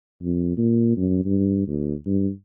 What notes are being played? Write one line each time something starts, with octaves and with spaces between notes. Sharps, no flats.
F2
A#2
F#2
G2
D2
G2